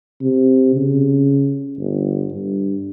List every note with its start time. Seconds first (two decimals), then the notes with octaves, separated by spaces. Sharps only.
0.21 C3
0.75 C#3
1.78 G1
2.31 G2